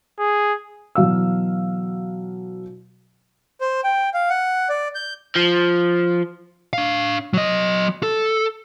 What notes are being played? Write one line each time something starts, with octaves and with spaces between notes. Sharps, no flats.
G#4
B2 E3 F#3 F5 E6
C5
G5
F5
F#5
D5
G6
F3
D4 F5
F#3 D#5
A4